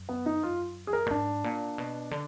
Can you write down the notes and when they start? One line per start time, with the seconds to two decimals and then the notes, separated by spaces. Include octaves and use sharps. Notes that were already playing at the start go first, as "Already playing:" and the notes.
Already playing: F#2
0.09 B3
0.26 D#4
0.43 F4
0.87 G#4
0.93 A#4
1.06 A#2
1.10 G#2 D4
1.44 A#2
1.78 B2
2.11 D3